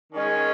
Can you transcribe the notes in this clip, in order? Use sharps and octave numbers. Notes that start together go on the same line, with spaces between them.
D#3 G#3 C#4